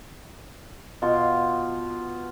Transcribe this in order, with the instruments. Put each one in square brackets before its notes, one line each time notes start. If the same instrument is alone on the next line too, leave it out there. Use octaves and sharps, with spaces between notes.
[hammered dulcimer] B2 F4 C6 C#6